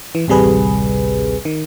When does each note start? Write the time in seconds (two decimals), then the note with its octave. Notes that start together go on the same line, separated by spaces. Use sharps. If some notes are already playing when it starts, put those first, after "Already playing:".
0.15 E3
0.28 A1 D2 C3 G3 G#4 B4
1.45 D#3